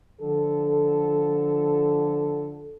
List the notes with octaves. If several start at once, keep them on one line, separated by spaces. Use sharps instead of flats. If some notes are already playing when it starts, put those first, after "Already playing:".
D3 F3 A4